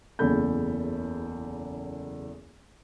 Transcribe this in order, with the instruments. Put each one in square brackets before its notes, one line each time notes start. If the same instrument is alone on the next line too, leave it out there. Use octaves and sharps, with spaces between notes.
[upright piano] F#1 E2 C#3 A4 B5 G6